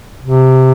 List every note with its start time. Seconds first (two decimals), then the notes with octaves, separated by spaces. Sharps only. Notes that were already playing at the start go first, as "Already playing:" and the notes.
0.23 C3